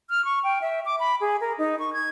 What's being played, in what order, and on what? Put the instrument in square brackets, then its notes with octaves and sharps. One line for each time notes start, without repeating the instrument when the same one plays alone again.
[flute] F6
C#6
G5
E5
D6
B5
G#4
A#4
D#4
C#6
G#6